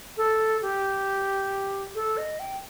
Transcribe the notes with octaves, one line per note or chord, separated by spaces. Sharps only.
A4
G4
A4
D#5
G5